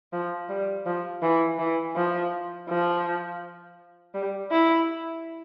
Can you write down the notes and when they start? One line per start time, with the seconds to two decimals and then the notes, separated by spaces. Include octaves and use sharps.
0.13 F3
0.49 G3
0.86 F3
1.22 E3
1.59 E3
1.96 F3
2.69 F3
4.14 G3
4.51 E4